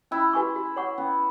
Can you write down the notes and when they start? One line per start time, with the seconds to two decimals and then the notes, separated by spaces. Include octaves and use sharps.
0.11 C#4 E4
0.33 F#4 B4 G#5 C#6
0.55 F#4
0.76 C#5 F#5 C#6
0.98 B3 C#4